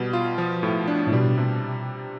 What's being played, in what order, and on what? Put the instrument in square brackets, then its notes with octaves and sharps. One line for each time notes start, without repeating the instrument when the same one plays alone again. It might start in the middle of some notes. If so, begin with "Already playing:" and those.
Already playing: [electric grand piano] B2 G3
F4
F3
A2
D4
[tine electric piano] A2
[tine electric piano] B2 [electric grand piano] G3
[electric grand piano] C3